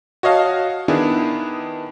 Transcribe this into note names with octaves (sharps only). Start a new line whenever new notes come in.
F#4 C#5 D#5 F5 A5
D#3 B3 D4 E4 G#4